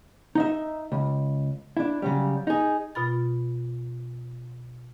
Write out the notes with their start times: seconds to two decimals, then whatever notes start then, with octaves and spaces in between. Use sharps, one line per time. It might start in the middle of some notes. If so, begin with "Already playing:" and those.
0.35 D#4 D#5 E5
0.92 C#2
1.77 D4 E4
2.02 C#3 F#3 G3
2.47 D#4 G#4
2.95 B2 F4 B5 A6